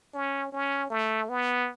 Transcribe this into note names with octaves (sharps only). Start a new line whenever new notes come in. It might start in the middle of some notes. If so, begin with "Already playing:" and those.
C#4
C#4
A3
B3